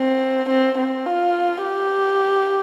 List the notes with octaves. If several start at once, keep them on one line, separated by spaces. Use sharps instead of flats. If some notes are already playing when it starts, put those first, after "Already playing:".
Already playing: C4
C4
C4
F4
G4